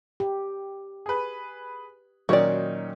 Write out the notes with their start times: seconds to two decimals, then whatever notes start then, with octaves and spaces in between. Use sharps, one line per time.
0.20 G4
1.06 G#4 B4
2.29 A#2 D#3 F#3 C#4 F#4 A#4 D5 D#5